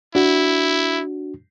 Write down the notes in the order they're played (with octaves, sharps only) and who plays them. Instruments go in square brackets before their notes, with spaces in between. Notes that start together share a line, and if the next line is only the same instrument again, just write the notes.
[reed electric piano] D4 F#4 [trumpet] E4